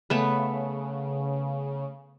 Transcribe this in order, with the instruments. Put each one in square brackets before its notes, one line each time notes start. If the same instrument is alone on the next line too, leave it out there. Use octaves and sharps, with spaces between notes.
[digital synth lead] C#3 [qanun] A3 B3 B4